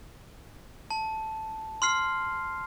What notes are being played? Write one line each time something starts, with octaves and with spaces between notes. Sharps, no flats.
A5
C6 F6 C7